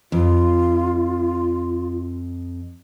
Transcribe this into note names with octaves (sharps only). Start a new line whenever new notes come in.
F2 F4